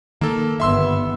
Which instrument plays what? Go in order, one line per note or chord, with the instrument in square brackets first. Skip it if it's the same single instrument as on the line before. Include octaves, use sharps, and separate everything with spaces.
[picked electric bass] D#3 [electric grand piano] A#3 A4
[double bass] G1 B3 [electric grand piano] E5 C6 E6